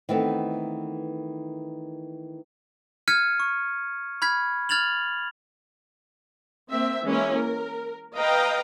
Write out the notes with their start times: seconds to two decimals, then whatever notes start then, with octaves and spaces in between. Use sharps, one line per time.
0.09 D#3 E3 A3 B3 C4
3.08 F6 G#6 B6 C#7 D#7
3.40 C#6
4.22 B5 F6 G#6 B6
4.69 F6 G#6 A6 F7 F#7
6.71 A#3 C4 E5
7.04 E3 G#3 A#3 C#4 E4
7.35 A#4
8.15 B4 D#5 F5 G5 A#5